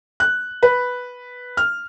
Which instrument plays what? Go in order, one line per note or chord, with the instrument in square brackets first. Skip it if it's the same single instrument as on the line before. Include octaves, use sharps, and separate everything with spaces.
[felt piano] F#6
B4
F6